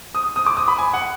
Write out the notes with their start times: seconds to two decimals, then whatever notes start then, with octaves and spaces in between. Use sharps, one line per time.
0.15 D#6
0.36 D#6
0.46 D6
0.57 D#6
0.68 B5
0.78 G#5
0.94 F#5